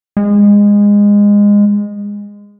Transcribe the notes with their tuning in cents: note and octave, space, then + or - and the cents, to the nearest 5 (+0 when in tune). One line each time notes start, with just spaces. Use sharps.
G#3 -20